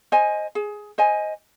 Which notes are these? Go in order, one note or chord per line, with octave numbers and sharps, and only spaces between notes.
C5 D#5 G#5
G#4
C5 D#5 G#5